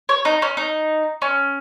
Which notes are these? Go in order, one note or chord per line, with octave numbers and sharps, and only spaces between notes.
C#5
D#4
C#4
D#4
C#4